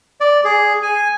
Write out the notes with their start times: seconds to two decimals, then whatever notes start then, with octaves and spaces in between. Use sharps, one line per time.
0.21 D5
0.44 G#4
0.82 G#5